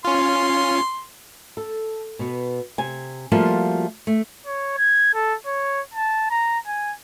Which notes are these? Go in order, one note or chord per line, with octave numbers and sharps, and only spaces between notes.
C#4 F4 C6
A4
B2 B3
C3 G#5
F3 G3 A3 A#3 F4 F#4
A3
C#5
G#6
A4
C#5
A5
A#5
G#5